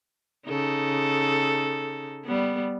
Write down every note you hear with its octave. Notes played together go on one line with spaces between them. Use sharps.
C#3 D#4 A4
G3 B3